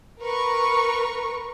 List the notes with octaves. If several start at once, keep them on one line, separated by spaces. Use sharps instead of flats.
A#4 B4 C#6